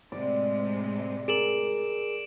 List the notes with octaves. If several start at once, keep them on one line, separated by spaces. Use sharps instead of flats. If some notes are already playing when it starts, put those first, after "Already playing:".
A2 C3 G#3 D5
G#4 A#4 D7 E7 F#7